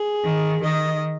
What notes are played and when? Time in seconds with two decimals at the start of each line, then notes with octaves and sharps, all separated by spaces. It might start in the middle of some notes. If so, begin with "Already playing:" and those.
Already playing: G#4
0.25 D#3
0.63 D#3 D#5